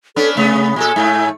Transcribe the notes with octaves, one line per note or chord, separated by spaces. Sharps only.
B3 C#4 D4 A4
C3 A3 B3
A#2 G4 A4 G#5
G#2 A3